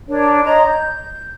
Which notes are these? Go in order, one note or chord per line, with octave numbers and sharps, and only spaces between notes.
D4 A#4 C#5
C#5 D#5 A#5 C6
G6